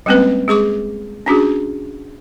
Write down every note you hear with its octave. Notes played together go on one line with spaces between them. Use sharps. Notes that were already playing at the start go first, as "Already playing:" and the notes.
G3 G#3 A#3 C4 C#4 B4
G#3 G#4 C#6 D6
C#4 D4 F#4 G#4